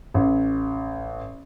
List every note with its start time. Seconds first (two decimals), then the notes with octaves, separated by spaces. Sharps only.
0.14 A1